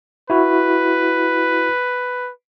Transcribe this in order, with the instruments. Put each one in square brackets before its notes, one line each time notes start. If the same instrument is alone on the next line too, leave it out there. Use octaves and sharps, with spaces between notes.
[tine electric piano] E4 F#4 [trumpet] B4